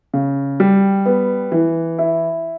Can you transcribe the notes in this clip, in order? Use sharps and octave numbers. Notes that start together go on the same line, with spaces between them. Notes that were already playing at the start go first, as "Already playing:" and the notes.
C#3
G3
B3
E3
E4